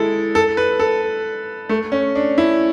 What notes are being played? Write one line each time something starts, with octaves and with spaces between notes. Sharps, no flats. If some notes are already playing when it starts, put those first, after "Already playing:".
Already playing: G#3 E4 A4
A4
B4
A4
A3
C#4
D4
E4